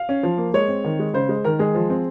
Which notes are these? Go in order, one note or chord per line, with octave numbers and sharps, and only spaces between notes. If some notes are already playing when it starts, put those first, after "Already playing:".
Already playing: F5
C#4
F3
A#3
G#3 C#5
C4
D#3
G#3
C#3 C5
G#3
D#3 A#4
G#3 G#4
F3
C4